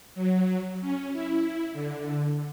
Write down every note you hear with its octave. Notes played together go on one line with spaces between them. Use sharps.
F#3
C#4
E4
D3